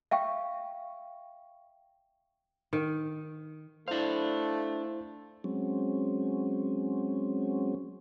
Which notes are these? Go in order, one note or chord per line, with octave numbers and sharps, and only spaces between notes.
E5 F5 G5 C#6
D#3
A3 D4 E4 C5 F5
F#3 G#3 C4 C#4